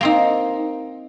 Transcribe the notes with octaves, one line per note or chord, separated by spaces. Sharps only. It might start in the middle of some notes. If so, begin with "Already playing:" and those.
A#3 C4 D#4